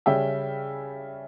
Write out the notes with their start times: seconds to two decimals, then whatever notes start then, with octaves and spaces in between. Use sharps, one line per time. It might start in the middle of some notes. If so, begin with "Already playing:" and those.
0.06 C#3 G3 C#4 E5 G5